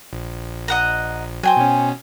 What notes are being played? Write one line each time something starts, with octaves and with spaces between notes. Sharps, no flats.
A#1
D#5 F#5 A#5
F#3 C5 G5 G#5
B2 C#4